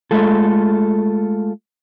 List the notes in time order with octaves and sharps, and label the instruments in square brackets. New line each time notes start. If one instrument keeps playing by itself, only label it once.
[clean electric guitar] G#3 A3 F4 A4